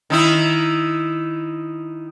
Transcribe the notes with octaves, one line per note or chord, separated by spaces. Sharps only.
D#3 D#4 E4